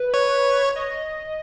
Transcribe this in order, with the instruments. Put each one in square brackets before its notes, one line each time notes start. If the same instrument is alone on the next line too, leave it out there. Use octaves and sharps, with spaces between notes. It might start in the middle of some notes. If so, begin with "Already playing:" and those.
Already playing: [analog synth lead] B4
[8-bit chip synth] C#5
[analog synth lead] D#5